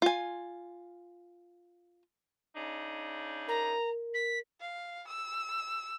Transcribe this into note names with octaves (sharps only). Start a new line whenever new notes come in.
F4 G#5
C#3 D4 D#4
A#4 A#5
B6
F5
E6